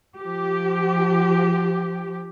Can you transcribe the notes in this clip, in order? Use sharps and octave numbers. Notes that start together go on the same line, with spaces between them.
F3 G4